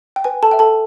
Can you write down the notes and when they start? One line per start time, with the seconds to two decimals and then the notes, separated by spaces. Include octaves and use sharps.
0.16 G5
0.24 B4 G#5
0.43 A4 A5
0.51 E5 G5
0.59 A4 A5